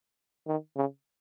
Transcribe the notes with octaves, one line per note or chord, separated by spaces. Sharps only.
D#3
C#3